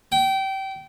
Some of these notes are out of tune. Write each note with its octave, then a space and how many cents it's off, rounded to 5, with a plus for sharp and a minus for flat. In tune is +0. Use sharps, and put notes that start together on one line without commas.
G5 -25